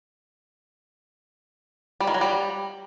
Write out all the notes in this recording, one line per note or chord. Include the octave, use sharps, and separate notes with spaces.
G3
D#3
F#3
G3